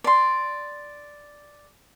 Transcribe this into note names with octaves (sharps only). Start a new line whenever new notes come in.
D5 C6